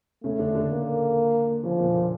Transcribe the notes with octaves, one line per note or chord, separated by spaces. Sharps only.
C#3 A3 C#4
D3 D4
D3 D4
A#3
C#3 F3 C#4
A#2 A#3
A#2 A#3